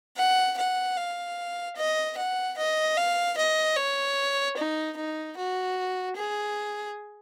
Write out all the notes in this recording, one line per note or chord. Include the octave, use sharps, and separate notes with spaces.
F#5
F#5
F5
D#5
F#5
D#5
F5
D#5
C#5
D#4
D#4
F#4
G#4